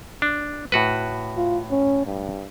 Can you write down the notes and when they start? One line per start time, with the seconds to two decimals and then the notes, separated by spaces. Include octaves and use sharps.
0.22 D4
0.72 A2 F#4 B4
1.37 F4
1.71 C#4
2.06 G2